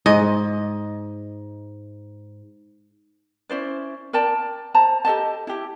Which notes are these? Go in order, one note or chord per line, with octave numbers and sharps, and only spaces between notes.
G#2 D#5
C#4 E4 C5 D5
A#4 D5 G5 A5
C5 A5 A#5
G4 A4 D#5 A5
E4 G4